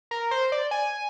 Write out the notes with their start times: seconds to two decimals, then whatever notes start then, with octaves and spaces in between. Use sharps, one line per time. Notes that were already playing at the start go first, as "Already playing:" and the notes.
0.11 A#4
0.31 C5
0.52 D5
0.71 G#5